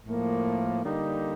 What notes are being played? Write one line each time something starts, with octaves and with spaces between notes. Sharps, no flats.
A2 F3 A#3
D3 G3 A#3 D#4